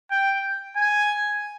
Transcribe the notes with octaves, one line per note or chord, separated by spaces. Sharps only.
G5
G#5